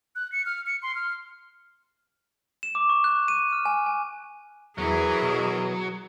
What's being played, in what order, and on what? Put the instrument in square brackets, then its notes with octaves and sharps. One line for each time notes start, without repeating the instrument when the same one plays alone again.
[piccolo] F#6
C#7
F6
C#7
C6
F6
[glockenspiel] E7
D6
C#6
F#6
D#7
F6
G#5
G#5
[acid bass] E2 [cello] E3 A#4 [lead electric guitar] F#3 [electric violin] G#4
[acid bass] B2